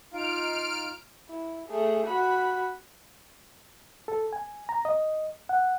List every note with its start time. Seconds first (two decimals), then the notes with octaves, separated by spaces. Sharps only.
0.13 D#4 F4 F5 F6 D7
1.29 E4
1.68 A3 G#4
2.07 F#4 B5
4.08 A4
4.33 G#5
4.69 A#5
4.85 D#5
5.49 F#5